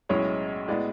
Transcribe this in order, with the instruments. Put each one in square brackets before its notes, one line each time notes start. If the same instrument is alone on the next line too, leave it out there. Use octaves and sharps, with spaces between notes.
[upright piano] B1 A2 G#3 C#4 E4 C#5
A2 G#3 B3 E4 D5